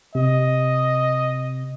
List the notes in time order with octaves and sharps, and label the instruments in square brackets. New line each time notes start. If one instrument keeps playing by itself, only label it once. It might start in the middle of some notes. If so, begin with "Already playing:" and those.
[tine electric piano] C3 [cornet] D#5